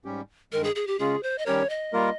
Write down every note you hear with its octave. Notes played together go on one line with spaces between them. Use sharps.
G#2 G3 C#4 G4
G2 D#3 G#3 A#4
G#4
G#4
G4
C#3 G#3 C#4 F4 G#4
C5
D#5
D#3 G3 C#4 G4 A#4 C#5
D#5
G3 A#3 F4 A#4